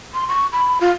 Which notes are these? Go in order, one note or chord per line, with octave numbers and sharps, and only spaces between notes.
C6
C#6
B5
F4